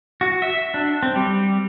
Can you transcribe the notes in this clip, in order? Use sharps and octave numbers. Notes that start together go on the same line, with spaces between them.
F#4
E5
D4
C4
G3